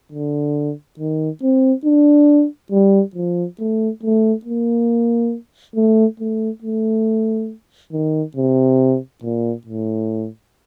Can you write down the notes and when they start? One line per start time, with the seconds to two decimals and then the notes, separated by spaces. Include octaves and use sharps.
0.12 D3
0.99 D#3
1.43 C4
1.85 D4
2.72 G3
3.15 F3
3.59 A3
4.03 A3
4.45 A#3
5.75 A3
6.20 A3
6.62 A3
7.92 D#3
8.36 C3
9.23 A#2
9.67 A2